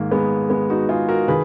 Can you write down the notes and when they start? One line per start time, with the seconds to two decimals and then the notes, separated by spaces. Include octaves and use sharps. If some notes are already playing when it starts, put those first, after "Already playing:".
Already playing: G#2 D#3 A#3
0.11 G#3 B3
0.50 G#3 B3
0.70 D#4 F#4
0.89 F4 G#4
1.08 F#4 A#4
1.28 D#3 G#4 B4